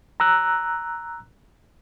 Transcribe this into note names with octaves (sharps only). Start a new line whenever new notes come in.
A#5 E6 F#6